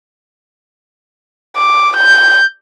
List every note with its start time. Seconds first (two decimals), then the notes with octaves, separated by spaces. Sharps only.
1.56 D6
1.97 G6